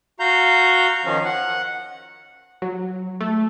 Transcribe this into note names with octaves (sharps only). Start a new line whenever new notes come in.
F#4 F5 A#5 G6
D#3 F3 C#4
F#5
F#3
A3